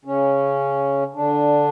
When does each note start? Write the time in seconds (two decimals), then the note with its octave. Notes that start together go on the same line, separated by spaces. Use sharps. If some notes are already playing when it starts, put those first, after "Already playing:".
0.05 C#3 C#4
1.14 D3 D4